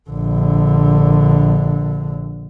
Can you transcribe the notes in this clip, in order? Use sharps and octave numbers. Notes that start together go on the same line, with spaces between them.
A#1 D3